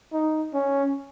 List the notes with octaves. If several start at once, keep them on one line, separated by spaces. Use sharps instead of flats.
D#4
C#4